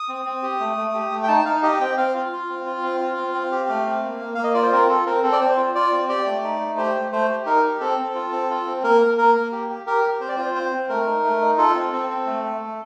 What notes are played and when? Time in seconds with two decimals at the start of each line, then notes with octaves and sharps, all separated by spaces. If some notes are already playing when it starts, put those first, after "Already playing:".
Already playing: D#6
0.09 C4
0.25 C4
0.43 G4
0.60 A3
0.77 A3
0.95 G4
1.11 A3
1.23 G5
1.28 D#4 A5
1.45 D#4 F5
1.63 G4 D#5
1.80 C4 G5
1.97 C4 F5
2.15 F4
2.32 F4
2.49 C4
2.66 F4
2.83 C4
3.00 F4
3.17 C4
3.34 C4
3.52 G4
3.69 A3
3.86 C4
4.03 A#3
4.20 A#3
4.35 A#3 F5
4.44 D#5
4.54 F4 D5
4.63 C5
4.72 C4 A#4
4.89 F4 A4
5.06 C4 A#4
5.23 C4 A4
5.32 D5
5.40 C4 C5
5.57 F4
5.75 F4 D5
5.92 C4
6.09 G4 D5
6.26 A3
6.44 D#4
6.60 A3
6.77 G4 C5
6.95 A3
7.12 A3 C5
7.29 G4
7.46 D#4 A#4
7.63 G4
7.80 C4 A4
7.97 C4
8.15 F4
8.32 C4
8.50 F4
8.66 C4
8.84 A#3 A#4
9.01 A#3
9.18 A#3 A#4
9.35 A#3
9.52 G4
9.69 G4
9.86 G4 A#4
10.04 G4
10.21 C4 C5
10.28 D5
10.36 F4 C5
10.55 C4 C5
10.72 C4
10.89 A3 A#4
11.06 D#4
11.24 A3
11.41 D#4
11.58 F4 A4
11.75 C4
11.93 C4
12.10 C4
12.26 A3
12.44 A3
12.61 A3